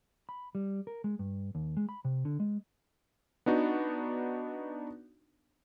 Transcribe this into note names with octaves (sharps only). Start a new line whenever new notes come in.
B5
G3
A#4
G#3
G2
D#2
G#3
B5
C3
D3
G#3
B3 D4 D#4 F#4